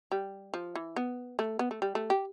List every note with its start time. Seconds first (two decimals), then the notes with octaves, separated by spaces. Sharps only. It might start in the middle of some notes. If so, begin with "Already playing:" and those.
0.11 G3
0.54 F3
0.75 E3
0.96 B3
1.39 A3
1.59 B3
1.71 A3
1.82 G3
1.95 A3
2.10 G4